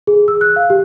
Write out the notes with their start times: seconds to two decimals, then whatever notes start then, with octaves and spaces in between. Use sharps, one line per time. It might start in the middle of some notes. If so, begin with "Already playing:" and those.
0.07 G#4
0.28 E6
0.41 F#6
0.56 F5
0.70 G4